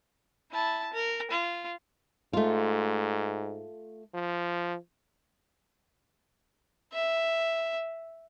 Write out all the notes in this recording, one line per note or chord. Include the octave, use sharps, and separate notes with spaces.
E4 A5
A#4
F4
G#2 A3 F4
F3
E5